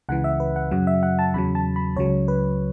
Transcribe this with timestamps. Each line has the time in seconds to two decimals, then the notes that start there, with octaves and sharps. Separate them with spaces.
0.09 C#2 C#3 E3 F#5
0.24 E5
0.40 B4
0.56 F#5
0.71 F#2 C#3 F#3 F#5
0.87 E5
1.03 F#5
1.19 A5
1.34 E2 C#3 F#3 B5
1.55 A5
1.76 B5
1.97 C#2 C#3 F#3 C#5
2.28 B4